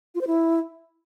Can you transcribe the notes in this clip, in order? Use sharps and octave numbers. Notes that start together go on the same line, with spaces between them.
F4
C5
E4